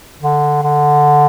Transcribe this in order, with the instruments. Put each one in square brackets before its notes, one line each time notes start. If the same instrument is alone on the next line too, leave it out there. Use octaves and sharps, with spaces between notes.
[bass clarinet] D3
D3